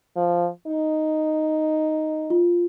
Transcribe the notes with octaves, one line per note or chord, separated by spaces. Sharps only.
F3
D#4
F4